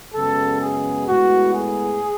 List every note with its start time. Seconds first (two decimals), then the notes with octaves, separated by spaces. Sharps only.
0.14 F#2 C#3 G#3 B3 A4
0.61 G#4
1.08 A2 G#3 B3 F#4
1.55 G#4